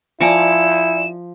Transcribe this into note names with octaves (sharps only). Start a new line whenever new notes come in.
F3 E4 D5 G#5 A#5 D6 C#7 E7